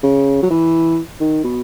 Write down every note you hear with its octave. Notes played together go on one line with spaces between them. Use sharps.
C#3
F#3
E3
D#3
B2